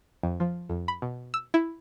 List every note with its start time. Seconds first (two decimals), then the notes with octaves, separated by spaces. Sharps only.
0.23 F2
0.40 F3
0.69 F2
0.88 B5
1.02 B2
1.34 E6
1.54 E4